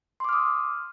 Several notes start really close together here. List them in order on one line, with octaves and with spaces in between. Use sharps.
C6 D6 F6 D#6